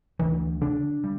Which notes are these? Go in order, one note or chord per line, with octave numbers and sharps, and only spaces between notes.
D2 E3
D3 D4
C#3
D3 G3